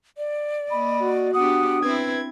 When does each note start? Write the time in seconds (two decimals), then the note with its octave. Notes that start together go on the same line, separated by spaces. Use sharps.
0.18 D5
0.70 A#3 D#5 B5
1.00 F#4
1.34 B3 D4 G4 F#5 D#6
1.83 C4 E4 B4 G#6